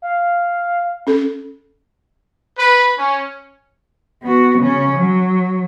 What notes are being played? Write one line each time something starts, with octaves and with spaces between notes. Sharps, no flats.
F5
C#4 A4
B4
C#4
B3 F#4
C#3 C#4
F#3